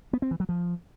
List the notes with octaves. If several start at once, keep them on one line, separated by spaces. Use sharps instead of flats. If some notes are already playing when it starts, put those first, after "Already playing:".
B3
C4
E3
F#3
F3